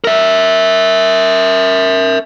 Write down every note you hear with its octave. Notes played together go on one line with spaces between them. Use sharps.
A#4 E5